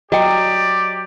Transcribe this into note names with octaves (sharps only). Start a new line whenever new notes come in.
F#3 F#4 G4 D5 D#5 G5